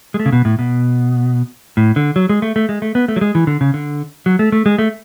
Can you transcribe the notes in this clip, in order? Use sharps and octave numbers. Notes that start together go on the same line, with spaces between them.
G#3
A3
C#3
B2
A2
B2
A2
D3
F#3
G#3
A3
A3
G#3
A3
B3
A3
F#3
G#3
E3
D3
C#3
D3
F#3
A3
A3
G#3
A3